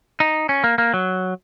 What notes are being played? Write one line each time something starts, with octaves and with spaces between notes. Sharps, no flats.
D#4
C#4
A#3
A#3
F#3